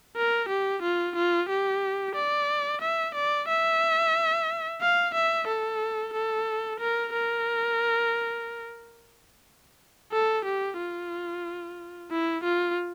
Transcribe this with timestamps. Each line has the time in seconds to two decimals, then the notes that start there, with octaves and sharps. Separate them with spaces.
0.16 A#4
0.49 G4
0.82 F4
1.16 F4
1.49 G4
2.15 D5
2.82 E5
3.15 D5
3.48 E5
4.81 F5
5.14 E5
5.48 A4
6.13 A4
6.80 A#4
7.13 A#4
10.12 A4
10.45 G4
10.78 F4
12.11 E4
12.44 F4